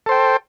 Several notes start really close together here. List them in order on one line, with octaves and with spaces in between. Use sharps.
A4 C5 G5